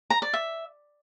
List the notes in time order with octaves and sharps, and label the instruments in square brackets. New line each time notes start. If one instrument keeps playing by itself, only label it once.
[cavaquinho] A#5
D5
E5